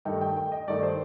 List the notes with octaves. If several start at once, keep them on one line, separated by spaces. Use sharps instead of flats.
G2 D#3 A3 D#4 G5
G5
G5
D#5
G2 D#3 A3 D#4 D5
C5